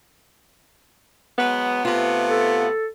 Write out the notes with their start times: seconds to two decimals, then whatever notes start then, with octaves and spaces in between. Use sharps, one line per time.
1.38 F#3 G#3 B3
1.85 C3 A3 B3 F4
2.30 A4